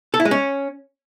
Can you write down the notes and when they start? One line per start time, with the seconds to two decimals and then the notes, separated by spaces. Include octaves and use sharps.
0.14 A4
0.20 E4
0.25 G#3
0.31 C#4